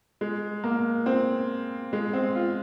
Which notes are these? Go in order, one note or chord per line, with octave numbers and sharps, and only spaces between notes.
G#3
A#3
C4
G#3
C4
F4